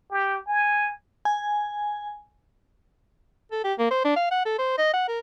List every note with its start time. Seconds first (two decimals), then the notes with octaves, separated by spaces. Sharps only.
0.11 G4
0.47 G#5
1.25 G#5
3.52 A4
3.64 G4
3.79 A#3
3.91 C5
4.05 D4
4.16 F5
4.31 F#5
4.46 A4
4.58 C5
4.78 D#5
4.94 F#5
5.08 A#4